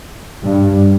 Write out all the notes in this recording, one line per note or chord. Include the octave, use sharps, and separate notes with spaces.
G2